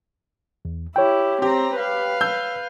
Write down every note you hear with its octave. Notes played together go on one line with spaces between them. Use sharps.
E2
E4 G4 C#5 G5
C4 G4 A#5
B4 F5
E6 G6